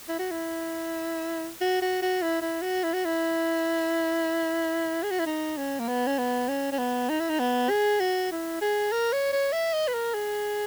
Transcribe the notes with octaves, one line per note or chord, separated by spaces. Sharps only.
E4
F#4
E4
F#4
F#4
F#4
E4
E4
F#4
E4
F#4
E4
G#4
F#4
E4
D#4
C#4
A#3
B3
C#4
B3
C#4
C#4
B3
D#4
E4
D#4
B3
G#4
F#4
E4
G#4
A#4
C#5
C#5
E5
D#5
B4
A#4
G#4